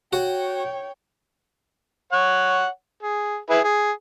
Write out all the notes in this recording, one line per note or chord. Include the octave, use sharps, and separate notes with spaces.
F#4 C#5 G5
C#5 F#5
G#4
E4 G#4 B4
G#4